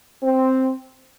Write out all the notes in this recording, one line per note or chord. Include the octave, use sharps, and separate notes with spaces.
C4